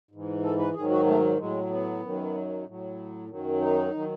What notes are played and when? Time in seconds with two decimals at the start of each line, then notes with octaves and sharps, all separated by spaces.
0.11 G#2 E3
0.43 A4
0.58 B4
0.74 G#2 D#3 F#3 G#4
0.90 F#4
1.06 A3
1.38 A2 F#3 G#3
1.69 B3
2.02 F#2 D#3 F#3
2.66 A2 F#3
3.29 F#2 D#3 F#3
3.60 D#4
3.94 D#3 F#3